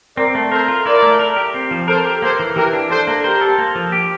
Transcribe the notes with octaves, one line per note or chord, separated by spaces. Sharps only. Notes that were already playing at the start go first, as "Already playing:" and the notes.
C4 A#4 D5
A3
A4 A#4 C5
F4
E4 A#4 D5
A3
A#4
G4
C4
F3
A4 A#4 C5
G4
A#3 A4 C5
E3
E3 G4 A#4
D4
D4 A4 C5
A#3
G4 A#4 C5
A4
A#3
F3
G4